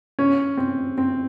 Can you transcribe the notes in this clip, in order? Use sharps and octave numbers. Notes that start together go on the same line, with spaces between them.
C#4
C4
C4